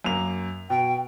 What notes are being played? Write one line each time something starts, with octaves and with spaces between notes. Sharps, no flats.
F#2 A#3 F7
B2 G5